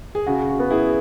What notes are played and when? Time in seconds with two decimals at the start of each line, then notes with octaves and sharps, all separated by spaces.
0.15 G#4
0.26 C#3 F#4
0.49 F#4
0.59 B3
0.71 E4 G#4